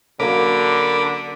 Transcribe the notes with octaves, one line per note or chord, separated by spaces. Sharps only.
D3 F#3 A#3 C#4 A#4 B5 D6